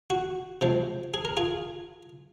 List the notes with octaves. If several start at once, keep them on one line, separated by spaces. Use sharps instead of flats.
F#4
C3 F3 G#3
G#4
A#4
F4 G#4